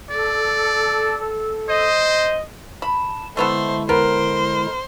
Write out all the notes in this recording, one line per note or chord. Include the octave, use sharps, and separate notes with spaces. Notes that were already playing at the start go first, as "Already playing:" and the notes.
A4 D5
C5 D#5
A5 B5
D3 G#3 A3 B3 E4 A4 C5
B3 A#4 C5